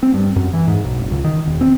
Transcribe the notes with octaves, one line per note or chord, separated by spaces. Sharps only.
C4
G2
F#2
E3
G#2
B1
F#1
C#2
D#3
E1
C4